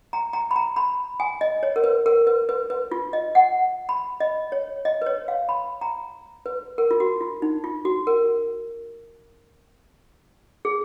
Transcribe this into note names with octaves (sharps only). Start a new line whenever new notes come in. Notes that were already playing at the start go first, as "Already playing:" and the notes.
A#5
A#5
B5
A#5
B5
G#5
D#5
C#5
A#4
B4
A#4
B4
B4
B4
F4
D#5
F#5
B5
D#5
C#5
D#5
B4
C#5
F5
B5
A#5
B4
A#4
F4
F#4
F4
D#4
F4
F#4
A#4
G#4